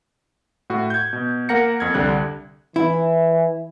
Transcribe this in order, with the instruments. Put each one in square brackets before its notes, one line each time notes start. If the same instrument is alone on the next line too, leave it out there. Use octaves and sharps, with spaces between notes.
[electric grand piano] A2 F#4
G6 G#6
B2
A#3 A#4 F#5 A#5 A#6 C#7
F2 G#6
C2 D3 G3 F#6
[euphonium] E3 [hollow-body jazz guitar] E4